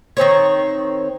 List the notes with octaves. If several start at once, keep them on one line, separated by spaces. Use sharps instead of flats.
D#3 C4 C5 C#5